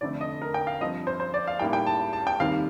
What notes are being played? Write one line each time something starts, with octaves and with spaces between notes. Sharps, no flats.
F1 F2 D3 A3 C4 D5
D#5
A#4
G5
F5
G2 F3 C4 D#5
C5
C5
D5
F5
A1 A2 G3 A#3 D#4 G5
G5
A5
A5
G5
F1 D#2 D#3 G3 C4 F5